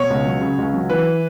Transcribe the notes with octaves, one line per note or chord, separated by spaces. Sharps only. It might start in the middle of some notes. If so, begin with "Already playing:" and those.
Already playing: B2 C#5
C#2
F#3
C#3
C#2
F#3
E3 B4